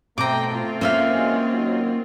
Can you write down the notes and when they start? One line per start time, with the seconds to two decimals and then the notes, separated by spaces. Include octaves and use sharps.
0.18 B2 A3 C4 G5 A#5 D6
0.51 C4 F4
0.81 A#3 C#4 C5 E5 F5
1.12 E3 F#3 G#3
1.53 D#2 F#3 D#4